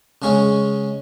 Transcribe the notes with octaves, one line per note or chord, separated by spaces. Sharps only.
C#3 G#3 C#4 G#4